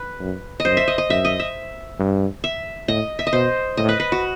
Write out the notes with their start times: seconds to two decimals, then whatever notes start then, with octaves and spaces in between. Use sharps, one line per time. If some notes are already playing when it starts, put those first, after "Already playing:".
Already playing: B4
0.20 F#2
0.60 D#5
0.65 F#2 C5
0.77 E5
0.88 D#5
0.98 D#5
1.09 F#2 E5
1.25 D#5
1.40 E5
1.99 G2
2.44 E5
2.88 A2 D#5
3.19 E5
3.27 D#5
3.33 B2 C5
3.77 A2 D#5
3.89 B4
4.00 B4
4.12 F#4